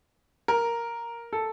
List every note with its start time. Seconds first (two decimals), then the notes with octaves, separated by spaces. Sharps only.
0.48 A#4
1.33 A4